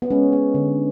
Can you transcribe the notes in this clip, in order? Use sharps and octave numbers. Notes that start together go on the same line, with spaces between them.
B3
G#3 C#4
B3
D3